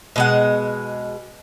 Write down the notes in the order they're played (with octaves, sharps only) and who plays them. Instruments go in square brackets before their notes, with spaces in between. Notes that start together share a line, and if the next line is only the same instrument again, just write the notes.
[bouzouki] B2 G#3 F#5